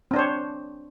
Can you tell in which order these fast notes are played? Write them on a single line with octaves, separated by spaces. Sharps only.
C4 D4 C5 C#5